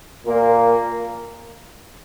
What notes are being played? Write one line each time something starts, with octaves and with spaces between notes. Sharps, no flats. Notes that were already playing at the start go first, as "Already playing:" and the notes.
A#2 A#3